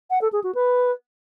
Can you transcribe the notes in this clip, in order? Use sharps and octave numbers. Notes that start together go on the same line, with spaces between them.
F#5
A4
G#4
F#4
B4